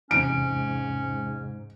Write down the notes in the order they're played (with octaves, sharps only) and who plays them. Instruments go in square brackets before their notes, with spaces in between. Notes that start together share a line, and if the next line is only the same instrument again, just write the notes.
[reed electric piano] E2 C3 [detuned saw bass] G#2 [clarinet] C#4 [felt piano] D7